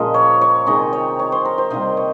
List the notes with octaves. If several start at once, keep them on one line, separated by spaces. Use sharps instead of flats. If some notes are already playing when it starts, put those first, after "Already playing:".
Already playing: A#2 C#3 F3 G#3 A#4 D#5
C#5
C#5
C3 D#3 G#3 D#5
C#5
C#5
C5
A#4
C5
C3 D#3 G3 A#3 D#5
C#5